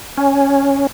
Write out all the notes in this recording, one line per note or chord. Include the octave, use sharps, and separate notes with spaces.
C#4